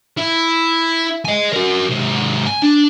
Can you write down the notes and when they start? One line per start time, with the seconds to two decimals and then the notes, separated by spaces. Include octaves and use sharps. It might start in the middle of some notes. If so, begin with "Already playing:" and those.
0.17 E4
1.25 D#5 G#5
1.53 F#4 A#4
1.90 G#2 C3
2.46 G#5
2.62 D4